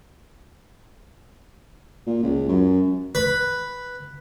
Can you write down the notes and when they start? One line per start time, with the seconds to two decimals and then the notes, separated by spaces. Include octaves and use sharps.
2.07 A#2
2.23 C#2
2.48 F#2
3.15 B4